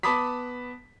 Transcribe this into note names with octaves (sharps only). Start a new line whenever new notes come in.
B3 A5 B5 D6 D#6 B6